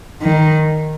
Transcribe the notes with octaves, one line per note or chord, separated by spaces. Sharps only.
D#3